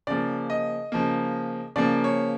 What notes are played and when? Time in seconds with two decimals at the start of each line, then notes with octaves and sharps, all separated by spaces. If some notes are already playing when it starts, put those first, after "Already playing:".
0.07 C#3 F3 A#3 D5
0.50 D#5
0.92 C#3 F3 A#3
1.76 C#3 F3 A#3 D5
2.04 C#5